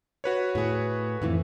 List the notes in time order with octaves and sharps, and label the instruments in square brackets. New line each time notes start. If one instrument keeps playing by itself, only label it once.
[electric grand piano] F#4 B4 C#5
[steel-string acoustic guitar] A2 G#4
F2 A2 E3